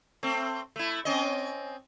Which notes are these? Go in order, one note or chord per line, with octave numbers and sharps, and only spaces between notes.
A3 C4
A3 E4
C4 C#4 D#5